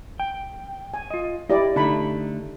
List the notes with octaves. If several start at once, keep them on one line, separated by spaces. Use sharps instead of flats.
G5
G#5
F4 D#5
E4 G4 D5 D#5
D3 A3 D#4 A5 B5